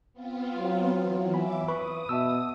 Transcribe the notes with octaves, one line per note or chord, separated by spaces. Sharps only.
B3 C4 F4
F#3
E3
C#5 E5 G#5 B5 D6
B4 B5 C#6 D#6
B2 E5 A5 E6